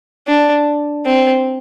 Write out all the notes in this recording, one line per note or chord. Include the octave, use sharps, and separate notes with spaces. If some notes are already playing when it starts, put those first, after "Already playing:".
D4
C4